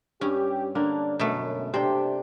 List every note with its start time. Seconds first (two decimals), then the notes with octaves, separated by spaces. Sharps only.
0.21 G2 C#4 G4
0.75 D3 A#3 D4
1.19 F#2 B2 A3
1.74 C3 D4 G4 C5 G5